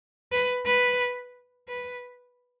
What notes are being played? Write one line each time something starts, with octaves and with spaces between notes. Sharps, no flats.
B4
B4
B4